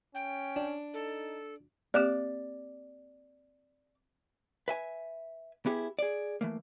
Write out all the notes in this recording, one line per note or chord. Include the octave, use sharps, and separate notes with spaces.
C#4 G5
D4
D#4 A4
A#3 C4 G4 D5
B4 E5 G#5
B3 E4 G4 G#4
G#4 D5
E3 A3 A#3